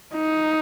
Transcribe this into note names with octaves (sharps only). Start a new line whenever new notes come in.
D#4